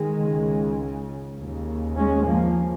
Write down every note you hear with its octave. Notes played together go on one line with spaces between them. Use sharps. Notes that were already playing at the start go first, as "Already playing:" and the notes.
Already playing: D#3 G#3
C#2 C#3
D#2 C#3
G#3 C#4
F3 A#3